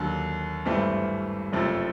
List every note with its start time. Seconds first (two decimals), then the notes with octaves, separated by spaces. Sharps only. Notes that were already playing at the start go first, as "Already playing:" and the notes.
Already playing: D#2 D3 F#3
0.65 G#1 G2 E3 A3 C4
1.52 F#1 F2 C3 F3 A3